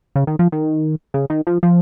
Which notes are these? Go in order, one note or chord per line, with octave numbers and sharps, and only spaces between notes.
C#3
D#3
F3
D#3
C#3
D#3
F3
F3